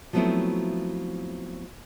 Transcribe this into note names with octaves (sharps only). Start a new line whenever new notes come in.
F3 F#3 A3 B3 C4 E4